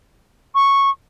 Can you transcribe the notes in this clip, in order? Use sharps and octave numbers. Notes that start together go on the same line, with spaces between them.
C#6